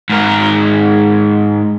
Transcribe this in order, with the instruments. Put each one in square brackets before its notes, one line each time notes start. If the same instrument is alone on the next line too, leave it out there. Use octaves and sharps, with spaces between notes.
[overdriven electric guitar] G#2 A#4